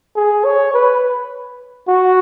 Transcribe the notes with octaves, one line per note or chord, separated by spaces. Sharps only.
G#4
C#5
B4
F#4